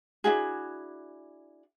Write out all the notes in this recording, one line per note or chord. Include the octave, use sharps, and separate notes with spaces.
D4 E4 F#4 G#4